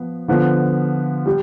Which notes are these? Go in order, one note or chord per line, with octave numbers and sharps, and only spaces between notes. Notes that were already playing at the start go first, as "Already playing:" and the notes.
Already playing: F3 B3
D3 F3 B3
G3